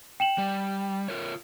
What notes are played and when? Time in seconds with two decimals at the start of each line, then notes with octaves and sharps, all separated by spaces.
0.20 G5 E7 F#7
0.38 G3
1.08 F4 A#4 C#5